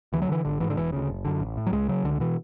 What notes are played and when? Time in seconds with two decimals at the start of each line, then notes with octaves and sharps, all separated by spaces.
0.13 D2 E3
0.22 F#3
0.28 D3 E3
0.45 G#1 D3
0.60 G#2 E3
0.70 D3
0.77 E1 E3
0.92 D2 C#3
1.09 F#1
1.25 F#2 D3
1.40 A1
1.57 A2
1.66 F#3
1.72 C#2 G#3
1.88 C#3 F#3
2.04 C#2 D3
2.20 B2 E3